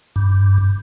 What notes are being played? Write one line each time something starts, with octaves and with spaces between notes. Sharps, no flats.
G2